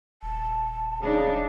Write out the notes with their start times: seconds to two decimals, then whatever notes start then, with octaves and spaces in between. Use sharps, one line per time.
0.23 D#1 A5
1.01 C#3 D4 D#4